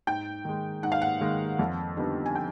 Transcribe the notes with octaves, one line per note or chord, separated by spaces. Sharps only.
G#2 G5
D#3 G#3
G#2 F#5
F5
F#5
D#3 G#3
F2
D3 G3 B3 D#4
G#5
G5